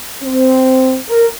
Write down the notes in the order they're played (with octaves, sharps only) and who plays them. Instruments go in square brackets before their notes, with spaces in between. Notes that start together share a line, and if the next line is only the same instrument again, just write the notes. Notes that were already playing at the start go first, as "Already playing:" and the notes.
[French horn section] C4
A#4